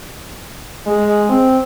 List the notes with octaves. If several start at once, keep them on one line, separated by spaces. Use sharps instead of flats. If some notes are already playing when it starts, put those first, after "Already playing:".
G#3
C4